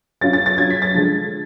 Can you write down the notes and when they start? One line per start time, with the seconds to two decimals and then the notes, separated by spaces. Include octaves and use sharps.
0.21 F#3 C#4 F4 A6
0.33 A6
0.46 A6
0.58 F#3 C#4 F4 G#6
0.70 B6
0.82 A6
0.94 D3 F3 G#3